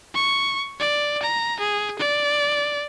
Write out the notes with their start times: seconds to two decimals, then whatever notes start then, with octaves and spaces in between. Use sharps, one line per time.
0.14 C#6
0.79 D5
1.22 A#5
1.60 G#4
1.99 D5